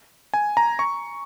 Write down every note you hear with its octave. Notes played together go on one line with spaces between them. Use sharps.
G#5
A#5
C#6